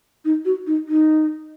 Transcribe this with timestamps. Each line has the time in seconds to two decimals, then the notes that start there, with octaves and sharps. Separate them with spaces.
0.25 D#4
0.45 F#4
0.67 D#4
0.88 D#4